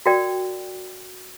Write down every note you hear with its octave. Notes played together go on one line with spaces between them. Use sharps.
F#4 A#4 D5 G5